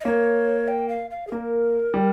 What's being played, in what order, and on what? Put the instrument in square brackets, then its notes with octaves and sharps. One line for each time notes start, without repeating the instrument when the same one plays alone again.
[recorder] D#5
[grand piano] A#3 [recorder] C#5
[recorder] G5
F5
F5
G#4
[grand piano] A#3 [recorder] A#4
[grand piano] G3